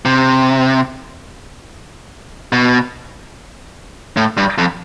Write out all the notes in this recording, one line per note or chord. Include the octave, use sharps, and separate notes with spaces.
C3
B2
A2
G2
F2